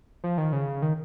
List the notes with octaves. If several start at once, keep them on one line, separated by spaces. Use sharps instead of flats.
F3
D#3
C#3
D#3